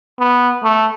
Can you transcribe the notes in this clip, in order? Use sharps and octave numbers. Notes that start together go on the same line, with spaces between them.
B3
A3